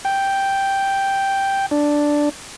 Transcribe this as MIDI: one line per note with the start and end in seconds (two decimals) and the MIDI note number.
0.05 1.66 79
1.71 2.29 62